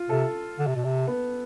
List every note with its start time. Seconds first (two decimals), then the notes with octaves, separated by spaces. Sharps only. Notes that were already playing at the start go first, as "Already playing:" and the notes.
Already playing: F4
0.09 C3 A4
0.59 D3
0.67 C3
0.76 B2
0.84 C3
1.07 B3